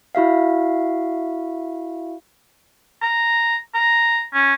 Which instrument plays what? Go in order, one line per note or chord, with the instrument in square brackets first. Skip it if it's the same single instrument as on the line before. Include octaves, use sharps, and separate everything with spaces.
[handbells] E4 F#4 E5 F5
[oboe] A#5
A#5
C#4